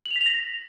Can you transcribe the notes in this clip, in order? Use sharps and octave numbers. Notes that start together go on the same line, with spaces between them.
F#7
F7
B6
F7
A#6